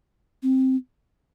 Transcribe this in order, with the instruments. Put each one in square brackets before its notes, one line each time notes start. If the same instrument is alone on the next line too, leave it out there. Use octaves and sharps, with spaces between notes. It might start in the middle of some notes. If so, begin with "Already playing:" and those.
[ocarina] C4